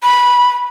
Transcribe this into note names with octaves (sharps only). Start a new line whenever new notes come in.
B5